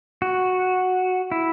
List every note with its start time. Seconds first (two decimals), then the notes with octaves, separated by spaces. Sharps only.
0.22 F#4
1.32 E4